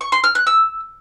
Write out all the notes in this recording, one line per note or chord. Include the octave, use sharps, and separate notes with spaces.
C#6
C6
F6
F#6
E6